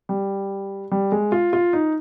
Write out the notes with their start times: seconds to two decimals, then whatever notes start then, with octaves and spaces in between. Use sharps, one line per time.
0.09 G3
0.91 G3
1.12 G#3
1.32 F4
1.53 F4
1.73 D#4